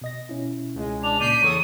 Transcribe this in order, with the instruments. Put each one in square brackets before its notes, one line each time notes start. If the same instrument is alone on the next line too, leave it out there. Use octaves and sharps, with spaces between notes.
[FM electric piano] B2 D#5 A#6
B2 C#4 E4
[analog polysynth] C#2 G#3
[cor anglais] D4 [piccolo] F7
[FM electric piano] A#2 C#3 [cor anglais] D5 [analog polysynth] G6 B6 C7 [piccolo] D#7
[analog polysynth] E2 A4 D#6 [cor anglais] C#5 [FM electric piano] A#5